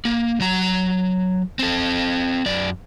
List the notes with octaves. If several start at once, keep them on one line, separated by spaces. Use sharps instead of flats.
A#3
F#3 A#5
C4 A4
F#2 D5